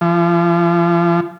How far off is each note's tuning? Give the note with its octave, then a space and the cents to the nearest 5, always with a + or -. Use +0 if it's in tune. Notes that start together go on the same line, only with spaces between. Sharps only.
F3 -35